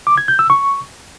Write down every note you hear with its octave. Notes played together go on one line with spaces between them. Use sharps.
D6
G#6
G6
E6
C#6